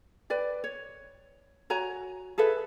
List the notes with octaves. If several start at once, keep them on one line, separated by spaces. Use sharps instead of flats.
B4 D5 G5
C#5
F#4 C#5 G#5 A#5
G#4 A4 B4 E5